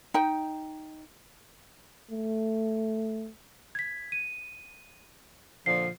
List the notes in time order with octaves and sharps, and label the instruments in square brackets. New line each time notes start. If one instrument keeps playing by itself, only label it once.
[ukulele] D#4 G5
[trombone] A3
[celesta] G#6 B6
D#7
[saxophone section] A#2 D3 F3 [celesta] C7